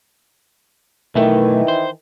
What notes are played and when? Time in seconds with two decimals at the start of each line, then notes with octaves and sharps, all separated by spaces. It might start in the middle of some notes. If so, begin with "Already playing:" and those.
1.15 B1 D#3 E3 A3
1.68 C5